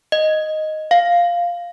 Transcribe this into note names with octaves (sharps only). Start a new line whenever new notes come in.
D#5
F5